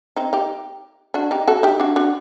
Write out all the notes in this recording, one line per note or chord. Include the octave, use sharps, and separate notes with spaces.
C4 D#4
D#4 G4
D4 F#4
D#4 G4
F#4 A4
D#4 G4
D4 F#4
D4 F#4